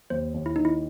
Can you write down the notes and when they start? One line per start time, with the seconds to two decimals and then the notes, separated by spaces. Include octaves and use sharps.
0.10 D#2 C5
0.34 D#2
0.46 E4
0.56 D#3 D#4
0.65 E4